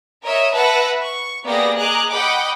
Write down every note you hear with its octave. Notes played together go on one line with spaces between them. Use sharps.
A#4 C#5 D#5 E5
B4 E5 F#5 A5 A#6 C#7
C#6
A#3 B3 G4 G#4 D5 A#6
G#4 D#5 A#5 D6 F#6
D#5 F#5 G5 B5 D6